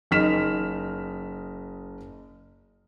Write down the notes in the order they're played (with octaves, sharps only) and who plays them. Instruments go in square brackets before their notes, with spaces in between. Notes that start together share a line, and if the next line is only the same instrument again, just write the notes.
[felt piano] F#1 D#4 F6 B6 E7